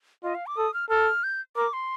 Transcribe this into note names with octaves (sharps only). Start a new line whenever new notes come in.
F4 D#5
F5
D6
A4 D#6
F6
A4 F6
G6
A#4 D6
C6